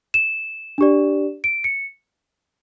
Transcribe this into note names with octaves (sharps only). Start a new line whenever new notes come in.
E7
D4 G4 D5
D7
C#7